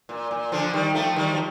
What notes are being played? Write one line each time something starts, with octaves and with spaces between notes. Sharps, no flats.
A#2
A#2
D3 F3
D#3 G3
F3 A3
D#3 G3
F3